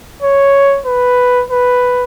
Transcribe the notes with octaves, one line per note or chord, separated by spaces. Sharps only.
C#5
B4
B4